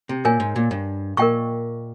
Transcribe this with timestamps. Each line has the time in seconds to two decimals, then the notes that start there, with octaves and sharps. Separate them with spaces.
0.09 C3
0.25 A#2 A#4 C#5 G#5
0.40 G#2
0.56 A#2
0.71 G2
1.17 A#2 A#4 D#5 G5 C#6